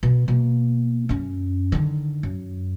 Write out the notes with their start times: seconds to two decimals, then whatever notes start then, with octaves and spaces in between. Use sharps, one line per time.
0.03 B2
0.28 B2 A#3
1.09 F#2 C#4
1.72 D3 D#3
2.23 F#2